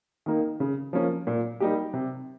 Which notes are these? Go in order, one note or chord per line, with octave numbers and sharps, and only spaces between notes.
D#3 A#3 D#4
C#3
F3 A#3 C#4
A#2
G3 A#3 D#4 G4
C3